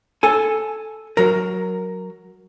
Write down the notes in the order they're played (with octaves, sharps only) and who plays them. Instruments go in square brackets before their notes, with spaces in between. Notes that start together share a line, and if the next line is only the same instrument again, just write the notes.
[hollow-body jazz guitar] A4 G#5
F#3 A#4